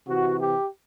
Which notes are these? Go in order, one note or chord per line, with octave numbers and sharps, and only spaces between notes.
C3 E3 F#4
G4